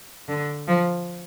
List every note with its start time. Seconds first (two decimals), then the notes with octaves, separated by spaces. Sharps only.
0.28 D3
0.67 F3